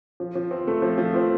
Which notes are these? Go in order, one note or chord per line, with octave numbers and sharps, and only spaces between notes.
F3
F3
C4
A3
F3
F3
C4